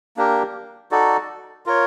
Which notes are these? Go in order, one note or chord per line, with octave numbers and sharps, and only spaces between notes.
A#3 D4 G4 A#4
D#4 F#4 A4 D5
F4 A#4 C#5